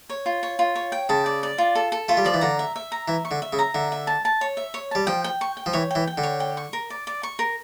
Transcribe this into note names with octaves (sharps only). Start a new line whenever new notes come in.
C#5
F4
C#5
F4
C#5
G5
C#3 A5
D5
D5
F4
A4
A4
A3 F4
G3
F3 D5
E3
D3 A#5
E5
E5
A#5
E3 E5
C#6
D3
E5
C#3
A#5
D3 E5
E5
A5
A5
C#5
E5
C#5
G3 A5
F3 G5
G5
C#6
G5
F3
E3 C#5
E3 G5
G5
D3
C#5
G5
C#6
A#4
D5
D5
C#6
A#4